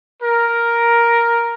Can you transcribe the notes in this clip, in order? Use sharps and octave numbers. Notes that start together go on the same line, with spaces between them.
A#4